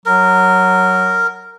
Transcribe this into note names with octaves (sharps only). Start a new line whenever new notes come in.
F#3 A#4